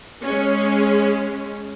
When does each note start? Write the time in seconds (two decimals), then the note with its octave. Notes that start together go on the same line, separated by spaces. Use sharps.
0.23 G#3 C#4